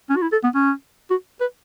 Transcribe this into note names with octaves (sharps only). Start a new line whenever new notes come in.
C#4
F#4
E4
A4
B3
C#4
F#4
B4